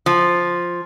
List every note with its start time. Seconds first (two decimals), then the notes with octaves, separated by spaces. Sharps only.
0.06 F3